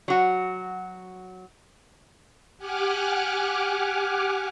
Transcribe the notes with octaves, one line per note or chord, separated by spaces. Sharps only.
F#3 F#4
G4 F#5 G#5 D6 F6 F#6